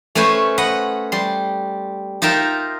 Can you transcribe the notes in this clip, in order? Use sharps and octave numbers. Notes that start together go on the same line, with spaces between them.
A3 C#4 B4 C5 G#5
B4 D#5 F#5
G3 C6
D#4 F4 A#4 E5 G5